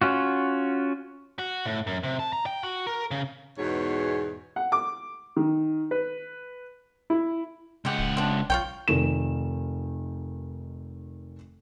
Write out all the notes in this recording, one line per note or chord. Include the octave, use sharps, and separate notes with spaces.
C#4 F4 F#4
F#4
A2
F#2
C3
A5
A#5
G5
F#4
A#4
C#3
E2 G#2 B2 C#5
F#5
D6
D#3
B4
E4
C#2 G#3 G4 F#5
D1
C4 D4
B1 F4 C#5 G5
F1 D#3 E7